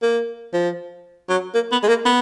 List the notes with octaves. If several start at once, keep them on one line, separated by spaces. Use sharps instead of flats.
A#3
F3
F#3
A#3
B3
G#3
A#3
B3